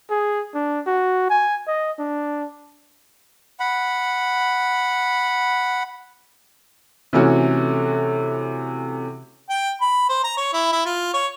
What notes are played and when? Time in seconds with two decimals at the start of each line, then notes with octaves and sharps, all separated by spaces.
0.10 G#4
0.54 D4
0.87 F#4
1.30 G#5
1.68 D#5
1.99 D4
3.60 F#5 B5
7.13 C3 E3 A3 C#4 F#4
9.50 G5
9.81 B5
10.09 C5
10.24 A#5
10.37 C#5
10.53 E4
10.72 E4
10.85 F4
11.14 C#5